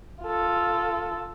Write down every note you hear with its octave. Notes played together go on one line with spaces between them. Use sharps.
F4 A4